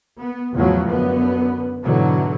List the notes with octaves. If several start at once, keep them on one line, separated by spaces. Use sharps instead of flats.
B3
E2 A2 C#3 F3 F#3
F#2 D3 B3
G#2 B2 D3 E3 F#3